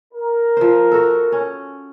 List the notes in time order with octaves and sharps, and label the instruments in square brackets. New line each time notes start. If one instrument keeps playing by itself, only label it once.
[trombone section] A#4
[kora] F3 C5
F#4 A4
C#4